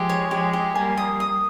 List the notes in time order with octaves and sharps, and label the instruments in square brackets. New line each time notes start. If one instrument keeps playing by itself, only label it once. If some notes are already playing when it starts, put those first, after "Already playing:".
Already playing: [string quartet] F3 G#3 [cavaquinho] G4
[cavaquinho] C#5
[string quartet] F3 G#3 [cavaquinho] G4
[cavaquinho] G4
[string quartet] G3 A#3 [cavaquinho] G#5
[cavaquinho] D#6
D#6